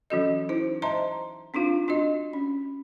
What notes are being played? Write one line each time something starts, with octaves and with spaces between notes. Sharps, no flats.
E3 F#3 C#4 F#4 A4 D#5
D#4 E4 C5
C5 D#5 E5 A5 A#5 C6
C4 D4 D#4 F4 F5
D4 F#4 D#5
C#4